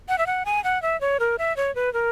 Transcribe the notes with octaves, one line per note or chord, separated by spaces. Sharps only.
F#5
E5
F#5
G#5
F#5
E5
C#5
A#4
E5
C#5
B4
A#4